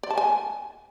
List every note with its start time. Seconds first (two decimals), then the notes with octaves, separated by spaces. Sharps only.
0.03 D5
0.10 A5
0.18 G#5